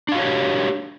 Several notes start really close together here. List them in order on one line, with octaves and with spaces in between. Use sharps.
D4 F5 F#4 C#5 G4